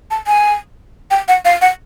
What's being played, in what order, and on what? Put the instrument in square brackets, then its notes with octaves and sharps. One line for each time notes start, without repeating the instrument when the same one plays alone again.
[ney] A5
G#5
G5
F#5
F5
F#5